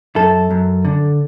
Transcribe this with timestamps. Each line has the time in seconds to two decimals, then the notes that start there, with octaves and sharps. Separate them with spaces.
0.16 F#2 A4
0.51 F#2
0.85 D3